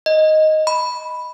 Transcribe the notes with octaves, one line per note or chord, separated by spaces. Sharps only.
D#5
B5